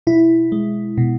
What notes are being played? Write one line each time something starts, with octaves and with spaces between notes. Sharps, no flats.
B2 E4
G#3
B2